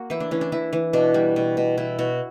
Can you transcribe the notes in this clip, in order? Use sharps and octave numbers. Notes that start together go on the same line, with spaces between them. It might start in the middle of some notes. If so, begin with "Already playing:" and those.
Already playing: A#3 F#4
E3 E4
D4
E3 C#4
D4
E3 E4
E3
B2 D4
G3
B2
B2
B2 E4
B2 F#4